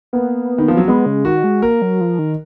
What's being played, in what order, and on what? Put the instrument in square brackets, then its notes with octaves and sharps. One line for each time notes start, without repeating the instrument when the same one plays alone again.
[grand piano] A#3 [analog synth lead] B3
[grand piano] D#3
F3
F#3
[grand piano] G#3 [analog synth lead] B3
[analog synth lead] C#3
[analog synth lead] D#3 [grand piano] F#4
[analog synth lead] G#3
[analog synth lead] A#3 [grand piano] A#4
[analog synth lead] F#3
F3
D#3